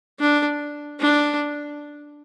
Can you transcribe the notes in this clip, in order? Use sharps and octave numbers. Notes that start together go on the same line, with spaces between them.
D4
D4